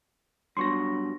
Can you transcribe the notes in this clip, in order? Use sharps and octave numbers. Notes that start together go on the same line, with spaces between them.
G2 F#3 B3 C6 C#6 A#6